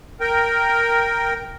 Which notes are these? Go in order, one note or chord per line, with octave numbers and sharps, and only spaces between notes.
A#4 G5